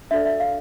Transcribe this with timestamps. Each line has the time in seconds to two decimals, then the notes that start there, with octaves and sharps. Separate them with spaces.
0.11 D4 F#4 A4 D5 E5
0.25 E5
0.40 F5